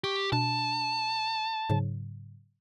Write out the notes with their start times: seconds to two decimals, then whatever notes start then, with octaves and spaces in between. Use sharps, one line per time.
0.04 G4 C#6
0.32 B2 D4 A5
1.70 G#2 C#3 F#3